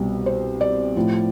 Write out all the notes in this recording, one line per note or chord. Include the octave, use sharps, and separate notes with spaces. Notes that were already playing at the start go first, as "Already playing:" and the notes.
Already playing: C2 B2 G3
C5
D5
A2 F3